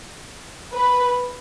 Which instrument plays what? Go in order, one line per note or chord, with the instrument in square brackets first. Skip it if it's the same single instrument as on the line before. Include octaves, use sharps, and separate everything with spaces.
[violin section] B4